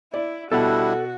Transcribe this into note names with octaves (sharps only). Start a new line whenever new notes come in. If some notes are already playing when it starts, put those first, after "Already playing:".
E4 D5
B2 G3 D4 E4 F#4 A4 F#5